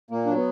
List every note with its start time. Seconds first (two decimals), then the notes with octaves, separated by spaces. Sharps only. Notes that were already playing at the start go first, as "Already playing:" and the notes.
0.11 A#2 A#3
0.26 F#3 D4
0.36 B3